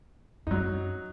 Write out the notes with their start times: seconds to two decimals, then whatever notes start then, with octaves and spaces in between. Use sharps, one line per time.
0.47 F#2 F#3 D#4